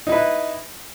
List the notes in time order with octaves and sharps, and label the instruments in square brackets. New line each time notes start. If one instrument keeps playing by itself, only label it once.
[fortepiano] D#4
E4
B4